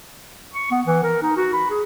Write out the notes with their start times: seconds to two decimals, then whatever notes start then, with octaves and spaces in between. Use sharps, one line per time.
0.54 C#6
0.71 B3
0.86 E3
1.03 A#4
1.22 D#4
1.36 F#4
1.53 B5
1.70 G#4